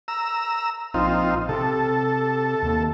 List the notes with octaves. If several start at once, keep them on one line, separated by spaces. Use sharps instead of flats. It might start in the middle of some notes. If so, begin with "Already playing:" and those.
A#5 E6
A#1 C4 D#4 F4
C3 A4
D#2